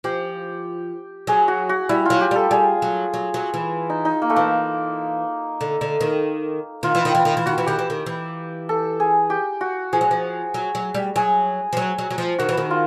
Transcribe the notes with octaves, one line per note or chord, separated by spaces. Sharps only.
F3 G4
F#3 G#4
F#4
F#4
G3 E4
F#3 F4
G4
G3 A4
G3 G#4
F#3
F#3
F#3
E3
D#4
D#4
A#3
A3
E3 A#3
D3
D3
D#3
D#3 F4
E3
D#3
E3
D#3
E3
D#3 F#4
E3
D#3 G4
E3
D#3
E3
A4
G#4
G4
F#4
F3 G#4
F#3
F3
F#3
F#3
G3
F#3 G#4
F3
F#3
F#3
F#3
F3
D#3 F#4
E3
D#3
F4